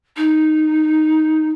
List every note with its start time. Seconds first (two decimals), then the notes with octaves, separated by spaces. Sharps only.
0.17 D#4